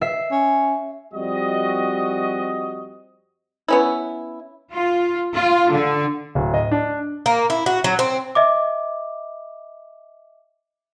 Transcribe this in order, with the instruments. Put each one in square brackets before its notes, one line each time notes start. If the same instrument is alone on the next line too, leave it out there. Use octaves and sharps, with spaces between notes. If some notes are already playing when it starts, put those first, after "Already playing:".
[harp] E5 C7
[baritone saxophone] C#4
[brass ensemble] F2 G3 C4 F#4 D#5
[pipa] B3 C#4 E4
[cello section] F4
F4
D3
[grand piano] D1
D#5
D4
[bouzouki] A#3
E4
F#4
F#3
C4
[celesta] D#5 E5 D6